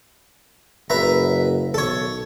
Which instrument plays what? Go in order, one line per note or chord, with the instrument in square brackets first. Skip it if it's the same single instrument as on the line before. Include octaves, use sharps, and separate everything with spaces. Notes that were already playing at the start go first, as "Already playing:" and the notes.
[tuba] F#1 [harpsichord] B4 E5 A#5
[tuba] B1 [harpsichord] A4 C#5